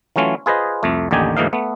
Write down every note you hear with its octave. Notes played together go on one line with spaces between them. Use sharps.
E3 F#3 A3 C#4 F4
F4 G#4 B4 C5 D#5
C2 F2 A3
A1 D#2 D3 D#4 G4 G#5
D2 G#2 E3 A#3 D#4 F5
A3 B3